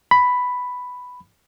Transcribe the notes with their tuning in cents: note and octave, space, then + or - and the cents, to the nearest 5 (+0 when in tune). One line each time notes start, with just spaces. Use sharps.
B5 +5